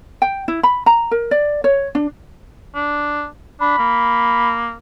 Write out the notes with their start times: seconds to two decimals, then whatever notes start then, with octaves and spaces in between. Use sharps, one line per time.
0.22 G5
0.48 E4
0.63 B5
0.86 A#5
1.11 A#4
1.31 D5
1.64 C#5
1.95 D4
2.75 D4
3.60 D4 B5
3.78 A#3